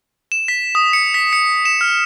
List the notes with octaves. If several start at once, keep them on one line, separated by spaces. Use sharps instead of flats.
E7
B6
D#6
C#7
B6
C#7
E7
F6